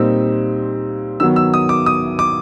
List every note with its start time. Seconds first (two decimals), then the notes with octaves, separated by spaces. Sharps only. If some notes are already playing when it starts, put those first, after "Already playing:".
Already playing: A#2 G3 C4 D#4 E6
1.20 D#3 F#3 B3 E6
1.36 E6
1.54 D#6
1.69 D6
1.86 D#6
2.19 D6